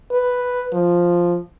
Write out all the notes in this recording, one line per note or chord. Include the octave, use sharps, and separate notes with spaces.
B4
F3